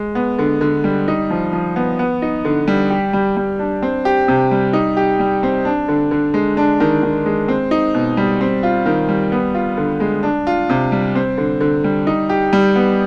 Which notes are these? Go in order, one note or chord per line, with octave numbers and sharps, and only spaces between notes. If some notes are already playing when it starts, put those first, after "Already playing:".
Already playing: G#3
B3
D3
D3
G3
D#4
F3
F3
B3
B3
D#4
D3
G3
G4
G3
G3
D4
C4
G4
C3
G3
D#4
G4
G3
C4
D4
D3
D3
G#3
D4
D#3
D#3
G#3
C4
D#4
B2
G3
C4
F4
D#3
G3
B3
F4
D3
G#3
D4
F4
C3
G3
C4
D3
D3
G3
D#4
G4
G3
B3